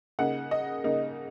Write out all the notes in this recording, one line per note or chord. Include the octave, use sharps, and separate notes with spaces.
C#3 A#3 D#4 F#5
D#5
C#3 A#3 D#4